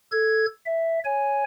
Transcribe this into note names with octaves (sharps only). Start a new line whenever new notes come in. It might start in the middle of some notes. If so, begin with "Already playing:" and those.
A4 G#6
E5
C#5 G#5